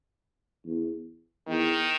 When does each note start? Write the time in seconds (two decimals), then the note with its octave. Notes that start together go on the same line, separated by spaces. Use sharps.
0.66 E2
1.47 E2 D#3